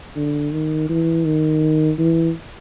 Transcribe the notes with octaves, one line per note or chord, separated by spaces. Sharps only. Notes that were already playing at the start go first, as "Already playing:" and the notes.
D3
D#3
E3
D#3
E3